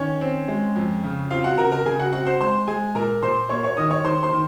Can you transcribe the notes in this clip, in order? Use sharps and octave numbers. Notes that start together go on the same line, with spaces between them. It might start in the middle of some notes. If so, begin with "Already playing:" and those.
Already playing: D#3 C#4 C#5
C4
G#3
F2
C#3
C4 F4 F5
F#4 F#5
C#3 A#4 A#5
A#4 A#5
C#3 G#4 G#5
F#4 F#5
C4 F#4 F#5
C5 C6
G#3 C5 C6
G#3 G#4 G#5
A#2 A#4 A#5
A#2 C5 C6
A#3 C#5 C#6
C#5 C#6
D#3 D#5 D#6
C#5 C#6
D#3 C5 C6
C5 C6
D#3